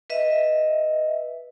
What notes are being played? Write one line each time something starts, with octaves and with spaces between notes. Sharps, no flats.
B4 D#5 E5